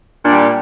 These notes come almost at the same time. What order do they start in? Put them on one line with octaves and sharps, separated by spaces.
A#2 D4 G3